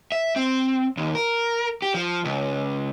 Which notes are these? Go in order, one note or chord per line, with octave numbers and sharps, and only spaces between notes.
E5
C4
D#2
A#4
G4
F3
C#2